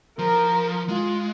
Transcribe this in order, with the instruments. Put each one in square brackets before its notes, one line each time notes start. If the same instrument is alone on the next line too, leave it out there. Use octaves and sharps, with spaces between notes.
[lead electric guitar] F3 [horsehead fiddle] A#4
[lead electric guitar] G#3 [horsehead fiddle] F4